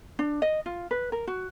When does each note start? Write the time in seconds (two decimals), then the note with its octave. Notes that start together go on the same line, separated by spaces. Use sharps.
0.19 D4
0.42 D#5
0.66 F4
0.91 B4
1.12 A#4
1.27 F#4